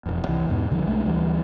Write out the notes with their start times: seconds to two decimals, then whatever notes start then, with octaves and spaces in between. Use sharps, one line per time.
0.06 E1 F2
0.28 C2 E3
0.49 E2 G#2 B2
0.71 C2 D3 F3 G3
0.86 B1 G#3 A3 D4
1.05 D2 E3 G3